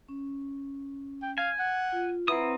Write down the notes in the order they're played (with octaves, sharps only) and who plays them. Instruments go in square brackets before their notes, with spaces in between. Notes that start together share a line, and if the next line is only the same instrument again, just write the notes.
[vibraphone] C#4
[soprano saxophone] G5
[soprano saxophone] F5 [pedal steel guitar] G#5
[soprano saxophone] F#5
[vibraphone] F4
[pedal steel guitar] C4 D#6 [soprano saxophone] E4 [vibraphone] B4 F#5 A#5